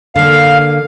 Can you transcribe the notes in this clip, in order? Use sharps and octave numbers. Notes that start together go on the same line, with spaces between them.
D3 A#3 F5